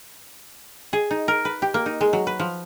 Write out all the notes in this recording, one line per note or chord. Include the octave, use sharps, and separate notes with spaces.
G#4
D#4
A#4
B4
G4
A#3
D#4
G#3
F#3
B4
F3